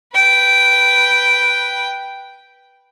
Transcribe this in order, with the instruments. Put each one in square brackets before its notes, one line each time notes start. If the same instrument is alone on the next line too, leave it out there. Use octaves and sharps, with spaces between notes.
[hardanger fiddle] B4 G5